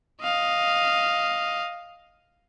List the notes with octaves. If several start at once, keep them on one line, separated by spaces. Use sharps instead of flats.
D#5 F5